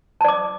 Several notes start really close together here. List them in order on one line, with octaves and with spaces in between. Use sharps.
A5 D5 D6